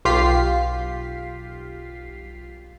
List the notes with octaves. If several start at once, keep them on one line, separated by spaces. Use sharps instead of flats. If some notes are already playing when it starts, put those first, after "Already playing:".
B1 F4 G4 F5 B6 C7